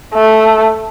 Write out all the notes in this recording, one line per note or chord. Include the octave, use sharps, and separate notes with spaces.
A3